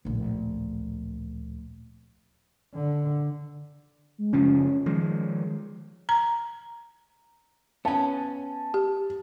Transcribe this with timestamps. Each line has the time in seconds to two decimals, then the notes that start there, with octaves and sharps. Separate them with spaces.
0.05 D1 A#1
2.75 D3
4.18 G#3
4.33 F#1 C#3 F3 C#4
4.86 D#3 F3 G#3
6.09 A#5
7.85 B3 C#4 A5
8.74 G4